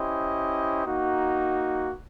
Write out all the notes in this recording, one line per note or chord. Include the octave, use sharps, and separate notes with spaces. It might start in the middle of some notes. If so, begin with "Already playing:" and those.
Already playing: C#4 E4 G4 C5 D#5
A#3 D#4 F#4